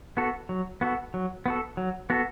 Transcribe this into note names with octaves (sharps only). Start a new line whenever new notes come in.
B3 F#4 A4
F#3
B3 F#4 A4
F#3
B3 F#4 A4
F#3
B3 F#4 A4